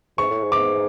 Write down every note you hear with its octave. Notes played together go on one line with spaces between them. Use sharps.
G#2 C#6
A2
G#2
D6